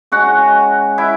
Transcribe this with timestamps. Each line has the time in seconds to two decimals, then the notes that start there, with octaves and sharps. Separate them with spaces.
0.12 C#3 G#3 F#4 F#5
0.98 E4 E5